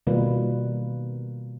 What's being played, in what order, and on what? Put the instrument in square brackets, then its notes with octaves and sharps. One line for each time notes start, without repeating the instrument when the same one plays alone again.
[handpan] B2 D#3 G3 A#3 F4 B4